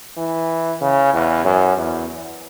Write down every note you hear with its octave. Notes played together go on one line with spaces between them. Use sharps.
E3
C#3
E2
F#2
E2